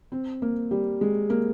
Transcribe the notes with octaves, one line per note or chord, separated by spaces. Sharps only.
C4
A#3
G3
G#3
A#3